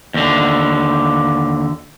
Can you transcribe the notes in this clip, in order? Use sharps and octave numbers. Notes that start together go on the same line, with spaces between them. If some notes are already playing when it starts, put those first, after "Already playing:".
D#2 D3